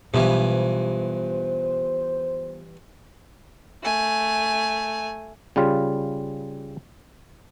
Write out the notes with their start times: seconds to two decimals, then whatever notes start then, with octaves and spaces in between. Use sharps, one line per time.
0.14 G2 B2 E3 F#3 G3 B3 F4 C5
3.83 A3 G#5
5.56 C#3 G3 F4